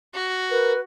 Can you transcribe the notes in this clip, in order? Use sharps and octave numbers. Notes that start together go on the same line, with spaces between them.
F#4
A#4 B4